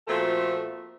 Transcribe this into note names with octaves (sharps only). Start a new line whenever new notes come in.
A#2 F3 A3 C4 F#4 A4